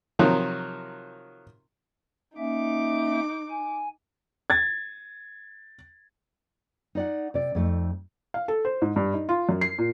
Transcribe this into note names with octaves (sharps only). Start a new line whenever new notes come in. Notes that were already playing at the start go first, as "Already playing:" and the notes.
C3 D#3 F3 F#3
A#3 C#4 D#4 E5 D6
G#5
G#6 A6
D#4 D5 F#5
C3 D5
F2 A3 D#4
F5
A4
C5
G#2
G2
D#4
F4
F#2
C7
A#2